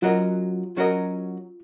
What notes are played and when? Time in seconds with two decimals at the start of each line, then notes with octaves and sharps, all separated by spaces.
0.02 F#3 C#4 F4 F#4 A#4 D#5
0.77 F#3 C#4 F#4 A#4 D#5